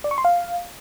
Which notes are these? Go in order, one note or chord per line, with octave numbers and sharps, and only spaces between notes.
D5
C#6
C6
F5